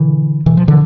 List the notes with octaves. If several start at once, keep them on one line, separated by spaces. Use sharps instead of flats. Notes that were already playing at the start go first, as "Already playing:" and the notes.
Already playing: B2 D3 E3
B2 E3
F3
D3 E3